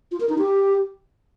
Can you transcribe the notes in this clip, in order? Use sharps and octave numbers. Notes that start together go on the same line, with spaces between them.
F4
A#4
D#4
G4